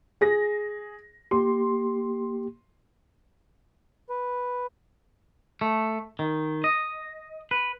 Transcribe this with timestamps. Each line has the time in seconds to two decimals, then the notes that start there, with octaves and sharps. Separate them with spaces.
0.21 G#4 A#6
1.31 A#3 G4 C6
4.10 B4
5.61 A3
6.19 D#3
6.64 D#5
7.51 B4